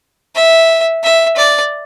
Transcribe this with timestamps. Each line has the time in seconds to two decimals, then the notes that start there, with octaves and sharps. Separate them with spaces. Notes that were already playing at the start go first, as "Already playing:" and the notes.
0.35 E5
1.04 E5
1.37 D5